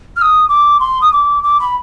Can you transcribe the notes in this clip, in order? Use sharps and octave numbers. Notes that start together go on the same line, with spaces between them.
F6
D#6
D6
C6
D#6
D6
D6
B5